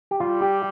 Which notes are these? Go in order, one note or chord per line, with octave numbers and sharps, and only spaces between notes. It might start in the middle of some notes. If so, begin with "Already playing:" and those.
G4
G3 F4
G4